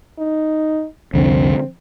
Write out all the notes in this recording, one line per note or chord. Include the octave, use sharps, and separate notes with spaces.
D#4
C2 F2 D3 C4